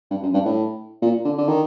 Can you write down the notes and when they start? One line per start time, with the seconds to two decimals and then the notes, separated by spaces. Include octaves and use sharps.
0.11 G2
0.23 F#2
0.34 G2
0.45 A2
1.02 A#2
1.25 D3
1.38 D3
1.48 D#3